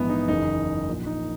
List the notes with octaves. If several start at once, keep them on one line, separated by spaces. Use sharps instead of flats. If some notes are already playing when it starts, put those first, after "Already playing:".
Already playing: A#1 G#2 E3 B3
D#4
F#1 E2 C#3 D#4
A#1 A#2
D#4